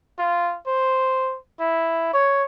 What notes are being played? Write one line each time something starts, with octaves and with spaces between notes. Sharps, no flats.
F4
C5
E4
C#5